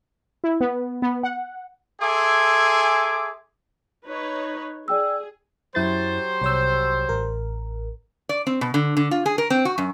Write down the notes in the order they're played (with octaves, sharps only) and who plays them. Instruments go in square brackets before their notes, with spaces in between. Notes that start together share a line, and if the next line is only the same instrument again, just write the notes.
[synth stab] E4
B3
B3
F#5
[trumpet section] G#4 A4 E5 G#5 C6 D6
[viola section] D#4 B4 C#5
[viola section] G#4 [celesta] D5 G5 E6
[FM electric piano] F#2 E4 A6 [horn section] F#3 G4 C5
[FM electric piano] C2 C#5 E6
A1 A#4
[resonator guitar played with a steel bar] D5
C4
B2
D3
D3
F4
G#4
A#4
C4
F#4
F#2